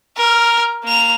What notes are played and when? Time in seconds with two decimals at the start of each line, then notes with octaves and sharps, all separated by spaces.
0.17 A#4 F6
0.84 A#3 F7